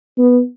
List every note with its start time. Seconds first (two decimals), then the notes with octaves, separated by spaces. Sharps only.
0.18 B3